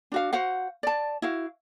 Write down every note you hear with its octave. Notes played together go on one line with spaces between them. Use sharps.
D4 F#4 F5
F#4 C5 F5 F#5
D5 A5
E4 F#4 F5